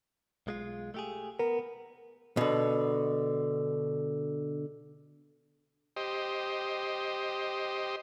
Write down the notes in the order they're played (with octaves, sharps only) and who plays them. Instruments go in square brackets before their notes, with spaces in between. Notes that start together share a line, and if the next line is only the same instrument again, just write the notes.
[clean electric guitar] B1 G#3 F4
A3 G4 G#4
[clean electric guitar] B3 [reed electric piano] A#4
[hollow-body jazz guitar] B2 D3
[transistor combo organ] G4 C5 D#5